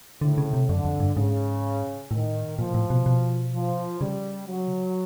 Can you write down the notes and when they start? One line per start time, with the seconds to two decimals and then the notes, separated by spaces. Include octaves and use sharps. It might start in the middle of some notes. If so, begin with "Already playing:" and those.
0.21 A2 D3
0.38 C#3
0.53 C3
0.68 F#2 D3
0.85 F2
1.00 G2
1.15 G#2 C#3
2.11 A2 D#3
2.58 A#2 F3
2.74 A2
2.90 B2
3.06 B2
3.54 F3
4.01 C#3 G3
4.48 F#3